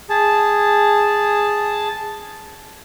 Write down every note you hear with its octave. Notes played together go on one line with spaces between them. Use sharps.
G#4 A5